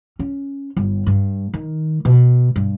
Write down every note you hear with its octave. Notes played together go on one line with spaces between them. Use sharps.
C#4
G1
G2
D#3
B2
G2